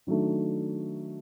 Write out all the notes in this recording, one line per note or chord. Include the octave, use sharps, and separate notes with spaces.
D#3 F#3 A3 D4